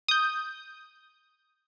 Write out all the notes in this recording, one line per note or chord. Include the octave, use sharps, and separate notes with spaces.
D#6 G6